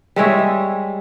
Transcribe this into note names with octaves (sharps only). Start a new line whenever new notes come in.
G3 G#3 C#5 E5